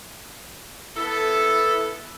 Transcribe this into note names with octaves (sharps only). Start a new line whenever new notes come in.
B3 E4 A4